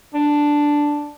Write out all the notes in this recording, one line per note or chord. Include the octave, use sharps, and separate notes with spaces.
D4